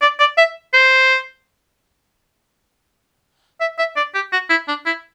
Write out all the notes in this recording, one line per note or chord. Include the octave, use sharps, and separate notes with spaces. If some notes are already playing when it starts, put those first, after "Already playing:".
D5
D5
E5
C5
E5
E5
D5
G4
F#4
E4
D4
E4